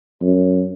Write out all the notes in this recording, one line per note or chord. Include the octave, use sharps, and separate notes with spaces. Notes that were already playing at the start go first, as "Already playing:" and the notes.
F#2